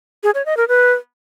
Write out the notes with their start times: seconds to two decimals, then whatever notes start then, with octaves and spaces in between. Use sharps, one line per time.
0.23 G#4
0.35 C#5
0.46 D#5
0.57 A#4
0.68 B4